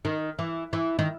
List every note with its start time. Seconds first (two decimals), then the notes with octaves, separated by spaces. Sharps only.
0.05 D#3
0.39 E3
0.73 E3
0.99 D#3